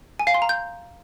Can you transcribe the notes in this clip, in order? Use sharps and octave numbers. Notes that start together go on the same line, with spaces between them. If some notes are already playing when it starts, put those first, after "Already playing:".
G#5
F5
C6
A#5
G6